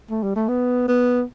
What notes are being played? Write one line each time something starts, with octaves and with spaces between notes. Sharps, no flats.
A3
G3
A3
B3
B3